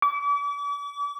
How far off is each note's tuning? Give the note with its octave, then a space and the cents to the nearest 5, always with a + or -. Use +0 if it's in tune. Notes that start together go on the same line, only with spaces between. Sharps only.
D6 -40